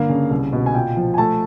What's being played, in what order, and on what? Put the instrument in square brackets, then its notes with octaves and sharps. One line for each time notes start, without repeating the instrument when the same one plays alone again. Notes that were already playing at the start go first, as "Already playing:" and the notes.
Already playing: [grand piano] G2 D3 A#3 F5
C#3
C2
B2
G#5
A#2 G5
F3
G#5
A3 A5